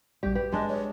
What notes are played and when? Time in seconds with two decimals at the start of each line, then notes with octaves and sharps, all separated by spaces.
0.23 A#1 G3 G4 D5
0.35 G4 B4
0.52 G#3 D4 D#5
0.69 C#5